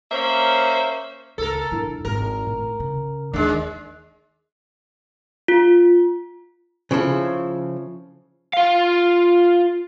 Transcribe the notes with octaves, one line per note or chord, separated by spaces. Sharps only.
A#3 C#4 C5 E5
C#2 A4 A#4
G2 E4
G#1 G#2 A#4
A2
C#3
D#2 E3 G#3 D4
F4
C#3 F3 E4 A4
F4 F5